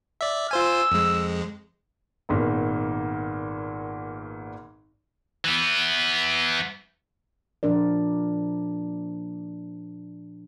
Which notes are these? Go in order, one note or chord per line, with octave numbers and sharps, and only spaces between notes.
D5 E5
F4 C5 G#5 E6
F2 G#3
G#1 A#2 B3
E3 B3
A#2 F3 D4 A#4 D5